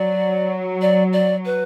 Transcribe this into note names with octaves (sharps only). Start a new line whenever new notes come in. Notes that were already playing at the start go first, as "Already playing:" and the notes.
Already playing: F#3 D5
D5
D5
B4